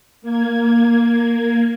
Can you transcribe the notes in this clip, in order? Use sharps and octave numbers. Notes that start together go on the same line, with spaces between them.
A#3 G#6